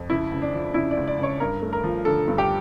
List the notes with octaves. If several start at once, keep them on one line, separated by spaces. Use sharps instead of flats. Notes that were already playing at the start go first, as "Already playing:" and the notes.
Already playing: F2
C#2 E4
C#2
D4
F3
C#3 E4
D5
C#2
D5
C#2
C#5
G2 A#4
A3
A#4
F3
D3 A4
G2
G4